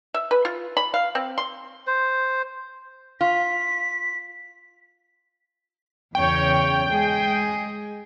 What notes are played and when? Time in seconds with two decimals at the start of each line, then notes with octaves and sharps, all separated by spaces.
0.14 E5
0.31 B4
0.45 F4
0.77 B5
0.94 F5
1.15 C4
1.38 C6
1.87 C5
3.21 F4 B6
6.15 E2 C#3 C#5 G5
6.90 G#3 G#4